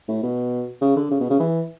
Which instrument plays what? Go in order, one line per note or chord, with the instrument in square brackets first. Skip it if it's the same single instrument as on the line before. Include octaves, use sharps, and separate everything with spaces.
[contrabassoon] A2
B2
C#3
D3
C#3
B2
C#3
E3